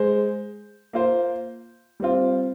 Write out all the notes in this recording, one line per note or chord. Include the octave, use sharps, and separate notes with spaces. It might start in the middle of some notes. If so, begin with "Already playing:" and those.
Already playing: G#3 C5
A#3 F4 C5
G3 C4 F4